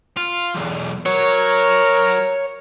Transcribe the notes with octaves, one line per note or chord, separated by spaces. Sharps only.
F4
B1 E2
F#3 A#4 C#5